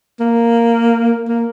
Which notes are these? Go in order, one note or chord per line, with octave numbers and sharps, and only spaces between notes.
A#3
A#3